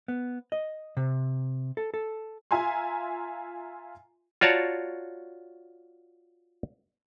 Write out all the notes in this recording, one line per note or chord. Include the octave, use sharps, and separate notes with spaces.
B3
D#5
C3
A4
A4
F4 E5 G#5 A#5 C6
F4 F#4 C#5 D5 A5 A#5